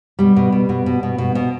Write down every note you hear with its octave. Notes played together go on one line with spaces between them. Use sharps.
B2 G3
B2
B2
B2
B2
B2
B2
B2